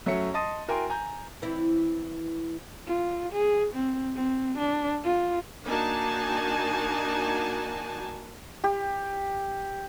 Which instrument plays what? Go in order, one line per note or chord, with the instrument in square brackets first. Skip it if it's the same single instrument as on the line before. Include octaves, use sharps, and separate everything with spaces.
[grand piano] F#2 F#3 A3 C#4 E5 C#7
D#5 A5 C6 D#6 A6 D#7
E4 F#4 A#4 G5 G#5 C6
G#5 A#5 G6
[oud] E3 C4 E4
[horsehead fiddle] F4
G#4
C4
C4
D4
F4
[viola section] A#3 D4 D#4 F#4 G#5 A5
[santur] G4